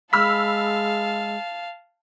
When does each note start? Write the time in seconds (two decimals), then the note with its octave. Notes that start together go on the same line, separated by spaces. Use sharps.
0.13 G#3 F5 A5 B5 E6 F6 B6